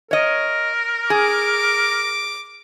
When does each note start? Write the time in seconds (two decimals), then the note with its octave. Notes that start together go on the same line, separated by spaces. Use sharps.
0.11 A#4 C#5 D#5
1.10 G#4 D6